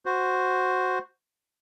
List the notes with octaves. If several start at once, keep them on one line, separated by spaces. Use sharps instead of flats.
F#4 C5